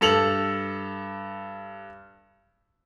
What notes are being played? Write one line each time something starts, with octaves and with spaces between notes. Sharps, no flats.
G2 A4 F7 F#7